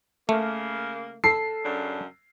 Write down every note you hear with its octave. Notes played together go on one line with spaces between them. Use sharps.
C#3 A3 A#3
A4 C7
F#2 C#3 D4